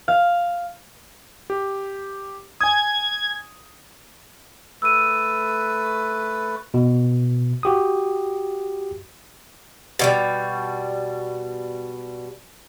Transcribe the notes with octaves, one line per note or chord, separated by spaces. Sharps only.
F5
G4
G#5 D#6 G#6
A3 B4 E6 D#7
B2
F#4 G4 D#6
B2 D#3 G3